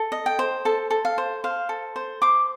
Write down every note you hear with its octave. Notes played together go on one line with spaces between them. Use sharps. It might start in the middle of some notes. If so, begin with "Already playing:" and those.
Already playing: A4
D#5
G5
C5
A4 A5
A4
F5
C5
C5 F5
A4
C5
C5 D6